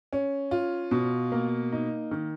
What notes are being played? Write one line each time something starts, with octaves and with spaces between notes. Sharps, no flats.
C#4
F4
B2
A#3
D#4
D#3